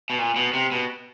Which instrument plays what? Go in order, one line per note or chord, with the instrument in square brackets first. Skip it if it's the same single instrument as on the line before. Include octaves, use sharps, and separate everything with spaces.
[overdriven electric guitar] B2
A#2
B2
C3
B2